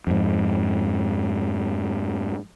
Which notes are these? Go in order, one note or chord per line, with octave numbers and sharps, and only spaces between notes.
F2 G#2